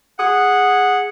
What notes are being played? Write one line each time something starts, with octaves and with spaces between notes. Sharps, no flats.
G#4 F#5